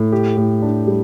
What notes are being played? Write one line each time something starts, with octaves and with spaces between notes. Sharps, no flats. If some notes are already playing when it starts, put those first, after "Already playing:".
Already playing: A2
G4
A2
D4
G3